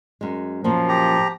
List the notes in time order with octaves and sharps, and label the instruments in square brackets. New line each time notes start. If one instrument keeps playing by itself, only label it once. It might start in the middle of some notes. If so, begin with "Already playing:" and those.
[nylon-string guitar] F#2 G#3
[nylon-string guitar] F#2 A#2 A#3 [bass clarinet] F3
[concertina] G4 A#5